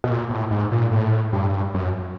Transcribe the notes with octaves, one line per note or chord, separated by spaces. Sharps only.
B2
A#2
A2
G#2
A#2
A2
G2
F#2